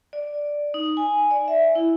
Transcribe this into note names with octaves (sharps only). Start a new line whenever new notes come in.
D5
D#4
G#5
D5
E5
E4